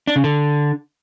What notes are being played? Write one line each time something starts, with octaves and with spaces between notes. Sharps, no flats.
D4
C#3
D3